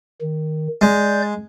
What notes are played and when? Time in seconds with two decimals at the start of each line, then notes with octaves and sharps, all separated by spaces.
0.21 D#3
0.81 G#3 D5 G6